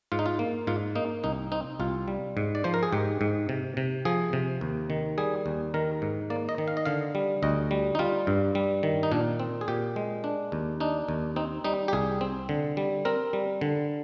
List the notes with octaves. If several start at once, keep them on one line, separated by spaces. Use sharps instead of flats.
G#2 F4
D#4
F4
A#3
G#2 F4
A#3 D#4
C2 D#4
C4 D#4
C2 F4
G3
G#2
D5
F3 C5
A#4
G#4
G#2 G4
G#2
C3
C3
F3 G#4
C3
D#2
D#3
G3 G#4
D#2
D#3 A#4
G#2
A#3 D5
D#5
D#3
F5
D#5
D3 F5
G3
D2 D#5
G3
D#4
G3 F4
G2
G3
D#3
D#4
A#2 D4
C4
G#4
A#2 G4
G#3
D4
D#2
D4 D#4
D#2
C4 D#4
G3 D#4
G4
C2 G#4
C4
D3
G3
C4 A#4
G3
D3